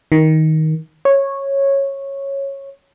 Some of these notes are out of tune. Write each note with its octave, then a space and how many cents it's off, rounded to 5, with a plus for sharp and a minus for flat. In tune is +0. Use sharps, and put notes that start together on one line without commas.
D#3 +15
C#5 -10